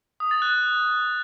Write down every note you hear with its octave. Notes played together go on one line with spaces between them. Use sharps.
D#6
A6
F#6